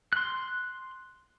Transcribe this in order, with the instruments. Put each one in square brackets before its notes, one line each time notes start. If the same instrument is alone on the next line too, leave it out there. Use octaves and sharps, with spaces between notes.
[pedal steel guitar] C6 F#6